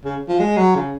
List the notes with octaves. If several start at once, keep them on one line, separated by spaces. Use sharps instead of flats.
C#3
F3
G#3
F#3
C#3